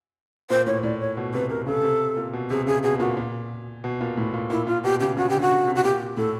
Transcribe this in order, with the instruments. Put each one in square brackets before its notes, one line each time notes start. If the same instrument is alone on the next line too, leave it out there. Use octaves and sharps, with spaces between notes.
[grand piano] A#2 [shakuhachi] C5
[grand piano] A2 [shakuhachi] C#5
[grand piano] A2 [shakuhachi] D5
[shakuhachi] C#5
[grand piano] B2
[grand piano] C3 [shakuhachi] B4
[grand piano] C3 [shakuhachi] A#4
[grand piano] C#3 [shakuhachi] A4
[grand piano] C3
A#2
B2
[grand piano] C3 [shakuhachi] G#4
[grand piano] C#3 [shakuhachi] G#4
[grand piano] B2 [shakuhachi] G#4
[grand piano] A#2 [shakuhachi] F#4
[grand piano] A#2
B2
A#2
A2
A#2
[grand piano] A#2 [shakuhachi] E4
[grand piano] A#2 [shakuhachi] F4
[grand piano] B2 [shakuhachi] G4
[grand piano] C#3 [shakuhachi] G4
[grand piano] C#3 [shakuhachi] F#4
[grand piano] D3 [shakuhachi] G4
[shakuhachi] F#4
[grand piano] D3
C3
[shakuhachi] F#4
[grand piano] A#2 [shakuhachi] G4
[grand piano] A2 [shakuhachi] A4